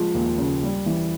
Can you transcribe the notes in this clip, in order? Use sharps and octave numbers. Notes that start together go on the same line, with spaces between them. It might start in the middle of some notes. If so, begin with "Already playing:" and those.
Already playing: F3 G#3
D#2
C#3
G3
E3